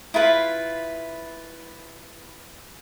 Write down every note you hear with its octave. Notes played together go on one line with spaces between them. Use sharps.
E4 F4 B4 F5